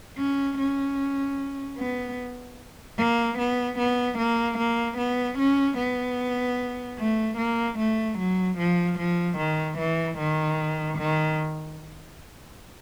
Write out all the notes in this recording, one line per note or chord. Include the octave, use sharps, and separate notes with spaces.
C#4
C#4
B3
A#3
B3
B3
A#3
A#3
B3
C#4
B3
A3
A#3
A3
F#3
F3
F3
D#3
E3
D#3
D#3